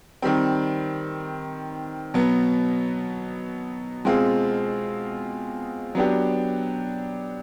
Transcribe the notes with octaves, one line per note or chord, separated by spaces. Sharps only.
D#3 G3 C4
B2 F#3 B3
B2 G#3 C4 F4 G#4
F#3 B3 D4 G4